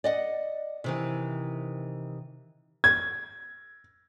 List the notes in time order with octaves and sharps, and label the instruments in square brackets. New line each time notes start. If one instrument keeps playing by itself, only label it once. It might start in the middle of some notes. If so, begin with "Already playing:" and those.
[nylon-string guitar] D5 D#5 F#5
C3 D#3 E3
[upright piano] G#6